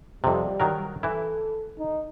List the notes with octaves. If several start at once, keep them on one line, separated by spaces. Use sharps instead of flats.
F2 C3 G3
D#3 F#3 A#4
E3 E4 A4
D#4